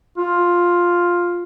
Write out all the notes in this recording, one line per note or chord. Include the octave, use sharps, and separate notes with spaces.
F4